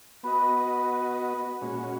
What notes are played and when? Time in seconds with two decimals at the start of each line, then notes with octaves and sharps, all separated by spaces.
0.23 B3 F#4 B4 D#5 B5
1.61 A#2 G#3 C#4 F#4